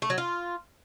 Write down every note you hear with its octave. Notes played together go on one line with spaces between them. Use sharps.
A3
F#3
F4